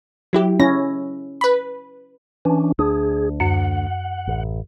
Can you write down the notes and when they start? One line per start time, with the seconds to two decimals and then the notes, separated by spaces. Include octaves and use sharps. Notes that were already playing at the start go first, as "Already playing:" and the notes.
0.33 F#3 E4 G4
0.60 C#4 E4 A#6
1.41 B4 B5
2.45 E3 C#4 D4
2.79 D2 D4 G#4
3.40 F#2 F#5
4.27 A1